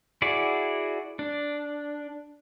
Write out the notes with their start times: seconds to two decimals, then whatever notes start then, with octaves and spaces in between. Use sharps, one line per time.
0.22 E4 F#4 G#4 D5
1.19 D4